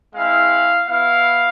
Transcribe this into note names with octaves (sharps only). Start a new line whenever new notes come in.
G#3 C4 E4 F5
B3 E4 F5